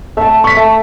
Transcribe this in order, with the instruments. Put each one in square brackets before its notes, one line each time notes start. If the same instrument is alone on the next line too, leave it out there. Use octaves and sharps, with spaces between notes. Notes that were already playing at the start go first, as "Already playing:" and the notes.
[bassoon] A3 [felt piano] E5 A5
[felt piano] C#6 B6
[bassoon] A3